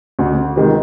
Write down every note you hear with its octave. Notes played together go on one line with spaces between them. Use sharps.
D2
C3 D#3 G#3